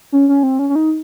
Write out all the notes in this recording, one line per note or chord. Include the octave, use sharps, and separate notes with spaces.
C#4
C#4
C4
C#4
C#4
D#4